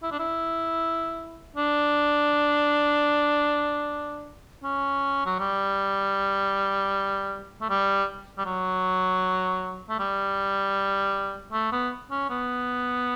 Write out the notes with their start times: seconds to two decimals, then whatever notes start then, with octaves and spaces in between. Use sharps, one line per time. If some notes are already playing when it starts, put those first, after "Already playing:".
0.03 E4
0.12 D4
0.19 E4
1.56 D4
4.64 C#4
5.26 F#3
5.39 G3
7.61 A3
7.70 G3
8.38 G3
8.46 F#3
9.89 A3
9.99 G3
11.52 A3
11.72 B3
12.11 C#4
12.30 B3